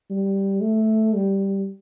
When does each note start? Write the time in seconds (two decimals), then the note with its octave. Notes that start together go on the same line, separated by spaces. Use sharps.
0.10 G3
0.61 A3
1.13 G3